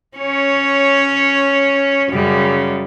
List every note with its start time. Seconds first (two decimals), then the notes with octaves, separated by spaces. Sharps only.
0.17 C#4 C#5
2.11 F#2 C#3 G3